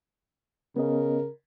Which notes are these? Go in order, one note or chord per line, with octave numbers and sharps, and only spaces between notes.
C#3 B3 C#4 A#4 D#5